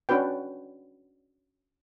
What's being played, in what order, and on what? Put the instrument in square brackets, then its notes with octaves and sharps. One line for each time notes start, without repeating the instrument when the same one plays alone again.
[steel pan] C#4 D4 F#4 B4 G5